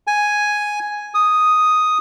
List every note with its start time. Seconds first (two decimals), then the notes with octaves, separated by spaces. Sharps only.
0.07 G#5
1.14 D#6